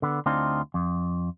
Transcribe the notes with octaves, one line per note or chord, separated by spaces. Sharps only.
D3 B3
D2 C4 D4 D#4 F4
F2